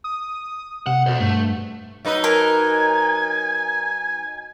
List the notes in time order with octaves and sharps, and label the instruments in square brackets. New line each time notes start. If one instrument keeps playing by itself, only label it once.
[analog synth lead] D#6
[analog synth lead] C3 [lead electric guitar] F#5
[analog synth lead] B2 [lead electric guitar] A4 C5
[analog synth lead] G2 [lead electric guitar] A3
[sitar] F#3 D#4 B4
[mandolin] A#4 [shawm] G#5